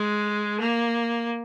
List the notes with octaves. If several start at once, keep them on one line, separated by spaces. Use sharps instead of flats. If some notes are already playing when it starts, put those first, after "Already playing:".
Already playing: G#3
A#3